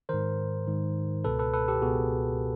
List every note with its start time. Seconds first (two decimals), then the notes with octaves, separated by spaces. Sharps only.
0.09 G#2 D#3 A#4 C5
0.67 G#2 D#3
1.24 C#2 B2 A4 B4
1.39 A4 B4
1.53 A4 B4
1.68 G4 A4
1.82 C#2 B2 F#4 G#4